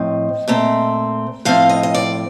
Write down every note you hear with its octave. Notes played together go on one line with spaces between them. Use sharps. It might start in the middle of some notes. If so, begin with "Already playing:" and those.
Already playing: A2 F3 C4 D#5
A#2 A3 C4
A2 F3 C4 F5
D#5
D#5
D5